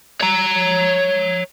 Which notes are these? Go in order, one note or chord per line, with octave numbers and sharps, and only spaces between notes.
C#5 A#5